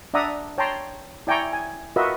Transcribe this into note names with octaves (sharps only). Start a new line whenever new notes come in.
D4 D5 E5 F#5 A#5 D#6
C#5 G5 A5 A#5 C6
E4 D5 G5 G#5 A#5 C#6
G#5
F4 F#4 A#4 B4 D#5 E5